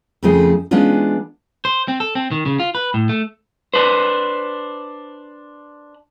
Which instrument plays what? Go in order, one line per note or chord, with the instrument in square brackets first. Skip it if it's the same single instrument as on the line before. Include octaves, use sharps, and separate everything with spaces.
[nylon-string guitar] F2 C#3 F3 A3 C4 G#4
E3 G#3 B3 C#4 D4 F4
[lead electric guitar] C5
C4
A4
C4
D#3
C#3
F4
B4
A2
A3
[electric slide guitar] D4 B4 C5